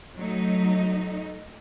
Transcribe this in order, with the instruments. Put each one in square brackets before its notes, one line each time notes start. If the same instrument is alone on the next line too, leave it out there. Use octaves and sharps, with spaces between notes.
[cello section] F#3 A3 D#4